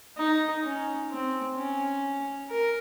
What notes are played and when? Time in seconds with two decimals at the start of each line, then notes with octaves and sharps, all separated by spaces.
0.18 D#4
0.63 C#4
1.11 C4
1.57 C#4
2.50 A#4